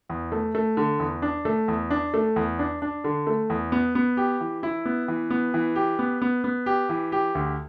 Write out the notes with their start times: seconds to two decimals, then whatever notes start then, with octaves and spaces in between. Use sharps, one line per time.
0.10 E2
0.32 A3
0.55 A3
0.77 D3
1.00 E2
1.22 D4
1.45 A3
1.68 E2
1.90 D4
2.14 A3
2.36 E2
2.59 D4
2.82 D4
3.04 D3
3.27 A3
3.50 E2
3.72 B3
3.95 B3
4.17 G4
4.41 E3
4.63 E4
4.86 B3
5.08 E3
5.30 B3
5.54 E3
5.76 G4
5.99 B3
6.22 B3
6.44 B3
6.66 G4
6.89 E3
7.12 G4
7.35 D2